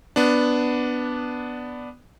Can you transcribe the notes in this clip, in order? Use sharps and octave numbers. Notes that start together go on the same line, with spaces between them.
B3 D4